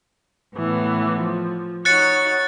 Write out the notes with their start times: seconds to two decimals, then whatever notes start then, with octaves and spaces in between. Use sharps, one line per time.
0.55 A2 E3 B3
1.20 F3
1.85 D#4 F#4 C#5 F#6 A6 C#7